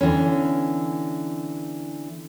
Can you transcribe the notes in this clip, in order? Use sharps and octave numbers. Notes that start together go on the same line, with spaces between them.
D3 E3 B3 C#4